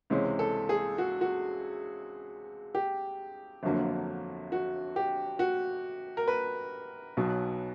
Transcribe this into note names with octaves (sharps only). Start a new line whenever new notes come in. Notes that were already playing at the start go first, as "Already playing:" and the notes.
C#2 C3 E3 G#3 C#4
A4
G#4
F#4
F#4
G4
G1 F2 D3 F#3 A#3
F#4
G4
F#4
A#4
B4
B1 B2 F#3